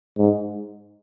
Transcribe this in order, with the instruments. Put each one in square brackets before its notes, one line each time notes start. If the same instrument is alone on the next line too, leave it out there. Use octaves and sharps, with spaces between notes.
[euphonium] G#2